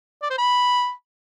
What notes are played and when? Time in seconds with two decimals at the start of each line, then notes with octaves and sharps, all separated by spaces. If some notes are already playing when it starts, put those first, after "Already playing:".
0.23 D5
0.30 C5
0.38 B5